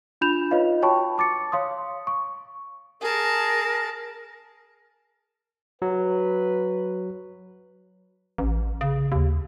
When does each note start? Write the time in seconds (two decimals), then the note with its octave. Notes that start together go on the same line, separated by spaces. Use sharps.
0.21 D4 F4 B5 G6 E7 F7
0.51 D#4 F4 B4 C#5 D#5 F5
0.82 F#4 C#5 G5 A5 B5 C#6
1.18 A5 D6 A6 C#7
1.52 C#5 F5 C6 D#6
2.07 C#6
3.01 G#4 A#4 A5
5.82 F#3 B4
8.38 A1
8.81 C#3
9.12 D#2